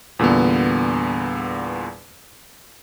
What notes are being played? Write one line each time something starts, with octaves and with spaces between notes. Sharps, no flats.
E2 A#2 D3 G3 B3